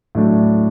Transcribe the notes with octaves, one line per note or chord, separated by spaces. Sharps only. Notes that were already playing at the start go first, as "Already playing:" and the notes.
A2 F#3 A3 D4